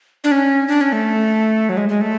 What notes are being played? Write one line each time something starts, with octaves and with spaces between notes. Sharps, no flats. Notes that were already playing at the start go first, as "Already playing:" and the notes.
D4
C#4
D4
C#4
A3
F#3
G#3
G#3
A3